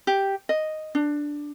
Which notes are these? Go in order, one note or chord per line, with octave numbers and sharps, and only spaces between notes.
G4
D#5
D4